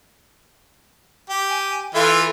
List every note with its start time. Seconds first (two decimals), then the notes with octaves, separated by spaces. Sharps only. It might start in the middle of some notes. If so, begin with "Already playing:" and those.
1.30 G4
1.49 G#5
1.95 E3 F4 A4 E5